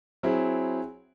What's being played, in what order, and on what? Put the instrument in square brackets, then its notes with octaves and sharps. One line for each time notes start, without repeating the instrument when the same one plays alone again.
[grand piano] F#3 C4 E4 G#4